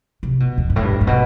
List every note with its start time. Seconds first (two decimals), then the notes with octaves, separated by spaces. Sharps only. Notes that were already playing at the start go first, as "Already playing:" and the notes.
0.23 C3
0.40 B2
0.58 E2
0.70 G2
0.76 A2
0.83 G2
1.01 A2
1.07 B2